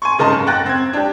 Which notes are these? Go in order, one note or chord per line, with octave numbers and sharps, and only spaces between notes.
G#5 C6 C#6
G#2 C#3 A#4 D#5 A5 C6
F#2
F#5 G5 F#6 A6 A#6
C4 G#6
D4 G4